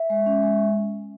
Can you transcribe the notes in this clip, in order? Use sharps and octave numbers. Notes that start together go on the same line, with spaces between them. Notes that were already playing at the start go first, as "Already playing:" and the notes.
Already playing: E5
G#3
C#4
G#3